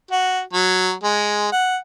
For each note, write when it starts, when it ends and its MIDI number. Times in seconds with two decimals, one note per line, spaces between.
0.11 0.41 66
0.53 0.93 54
1.03 1.51 56
1.52 1.76 78